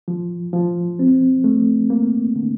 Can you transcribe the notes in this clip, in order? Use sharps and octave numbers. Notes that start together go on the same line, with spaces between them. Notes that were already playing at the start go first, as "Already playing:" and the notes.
F3
F3
C4
A3
A#3
D3